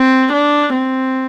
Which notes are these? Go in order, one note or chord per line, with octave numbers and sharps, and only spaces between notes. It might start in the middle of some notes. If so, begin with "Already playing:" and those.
Already playing: C4
D4
C4